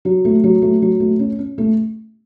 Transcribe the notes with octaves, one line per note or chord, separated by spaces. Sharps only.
F#3
A3
F#3
A3
F#3
A3
C#4
C#4
A3